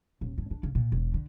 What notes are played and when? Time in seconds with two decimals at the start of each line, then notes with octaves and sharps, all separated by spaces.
0.21 D#1
0.38 G2
0.51 D4
0.63 C#3
0.75 A#2
0.92 E1
1.14 D3